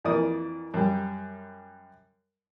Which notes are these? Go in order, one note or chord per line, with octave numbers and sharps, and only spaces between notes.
F2 E3 A#3 D5 D#6
F#2 G3